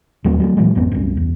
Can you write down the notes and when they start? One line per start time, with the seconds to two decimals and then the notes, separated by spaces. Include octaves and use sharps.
0.24 D#2 F#3 A3 C4
0.40 F#3 G#3 A3
0.57 A#2 E3 F#3 G#3
0.75 G#1 F2 B3 C4
0.92 C2 F#2
1.17 E2